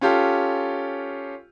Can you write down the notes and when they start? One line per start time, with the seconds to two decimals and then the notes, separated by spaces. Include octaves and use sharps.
0.01 C#4 F4 G4 A4